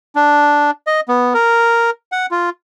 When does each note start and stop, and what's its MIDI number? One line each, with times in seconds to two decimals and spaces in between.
0.16 0.71 62
0.87 1.00 75
1.08 1.34 59
1.34 1.90 70
2.12 2.26 78
2.31 2.50 65